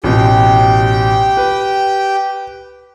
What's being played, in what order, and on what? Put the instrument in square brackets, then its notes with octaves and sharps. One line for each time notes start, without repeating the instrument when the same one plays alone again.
[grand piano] A1 B2 [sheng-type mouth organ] G4 G5
[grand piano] B4